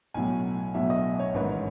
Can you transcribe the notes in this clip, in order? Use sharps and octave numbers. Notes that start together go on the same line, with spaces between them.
B1 A2 F#3 G#5
B1 A2 F#3 E5
D#5
C#5
A1 G#2 D#3 B4
C#5